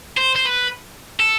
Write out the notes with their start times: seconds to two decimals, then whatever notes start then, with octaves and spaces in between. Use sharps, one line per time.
0.17 C5
0.36 C5
0.46 B4
1.20 A4